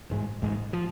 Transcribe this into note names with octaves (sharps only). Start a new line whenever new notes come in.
A1 G#2 G#3
A1 G#2 G#3
F3